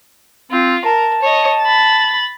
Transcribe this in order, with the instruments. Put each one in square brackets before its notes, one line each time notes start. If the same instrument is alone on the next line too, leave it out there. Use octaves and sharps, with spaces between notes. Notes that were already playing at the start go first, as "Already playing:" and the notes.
[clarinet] C4 [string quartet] F4
[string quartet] A#4 [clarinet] A5
[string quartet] C#5 D#5
B5 A6